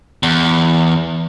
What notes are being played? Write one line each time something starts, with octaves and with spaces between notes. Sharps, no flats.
E2